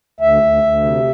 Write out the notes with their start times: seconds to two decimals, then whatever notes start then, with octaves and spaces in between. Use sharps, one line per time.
0.20 D2 E5
0.42 D2
0.63 D2
0.83 C3